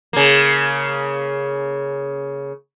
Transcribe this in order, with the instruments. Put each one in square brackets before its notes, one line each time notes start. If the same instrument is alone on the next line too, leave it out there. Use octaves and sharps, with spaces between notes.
[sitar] C#3 A#3